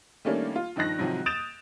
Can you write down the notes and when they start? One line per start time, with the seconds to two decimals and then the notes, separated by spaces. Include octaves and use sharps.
0.25 D#3 G3 A3 A#3 C#4 D4
0.56 F4
0.76 G2 D#3 F3 D#4 F#6 A#6
0.99 G#2 C3 D#3 F3 F#3
1.26 D#6 G6 A6 D7 E7 F7